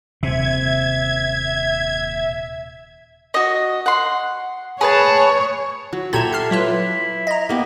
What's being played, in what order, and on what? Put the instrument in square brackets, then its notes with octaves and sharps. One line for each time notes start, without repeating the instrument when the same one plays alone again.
[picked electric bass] D#1 [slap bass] C3 [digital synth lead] E5 [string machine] G#6
[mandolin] F#4 D#5
F#5 C6
[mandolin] G#4 B4 A5 [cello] C#5
[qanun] F#3
[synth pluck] A#2 A#5 G#6 [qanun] G4 E5 [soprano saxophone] A4
[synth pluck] A5 F6 C7
[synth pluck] F#3 F4 B4 [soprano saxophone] E4
[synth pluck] D#5 A#5
[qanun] A#3 B3 G4